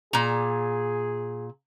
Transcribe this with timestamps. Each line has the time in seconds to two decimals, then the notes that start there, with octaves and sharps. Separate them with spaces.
0.13 A#2 G#4 A#5